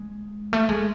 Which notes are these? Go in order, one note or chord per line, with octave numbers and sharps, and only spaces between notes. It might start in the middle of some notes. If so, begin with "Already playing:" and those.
Already playing: G#3
A3
G#3